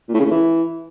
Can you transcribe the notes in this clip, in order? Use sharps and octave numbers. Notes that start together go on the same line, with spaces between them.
A#2
A2
C#3
A2
E3